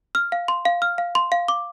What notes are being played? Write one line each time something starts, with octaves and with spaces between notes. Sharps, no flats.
F6
F5
C6
F5
F6
F5
C6
F5
D6